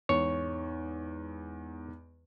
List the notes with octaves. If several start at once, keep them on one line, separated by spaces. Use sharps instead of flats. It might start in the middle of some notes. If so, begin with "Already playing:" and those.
E2 G#2 C#5